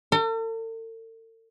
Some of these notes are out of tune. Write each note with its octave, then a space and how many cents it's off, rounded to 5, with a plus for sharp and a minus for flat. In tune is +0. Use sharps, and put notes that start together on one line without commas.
A4 +45